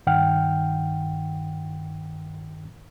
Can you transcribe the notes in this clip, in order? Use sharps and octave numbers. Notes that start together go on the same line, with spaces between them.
G2 D#3 F#5 G5 F6